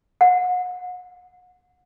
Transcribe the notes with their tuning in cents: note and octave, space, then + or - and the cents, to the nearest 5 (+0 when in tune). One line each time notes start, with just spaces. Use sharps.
F#5 -35